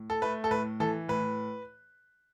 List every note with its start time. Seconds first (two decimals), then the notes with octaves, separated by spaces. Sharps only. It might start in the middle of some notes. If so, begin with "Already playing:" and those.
Already playing: A2
0.10 A4
0.22 A3 B4
0.44 A4
0.51 A2 B4
0.80 E3 A4
1.08 A2 B4